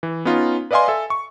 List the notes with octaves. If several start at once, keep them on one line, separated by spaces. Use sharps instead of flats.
E3
B3 C#4 D#4 F4
B4 D5 D#5 F5 G#5 C6
A4 E5 G#5
C#6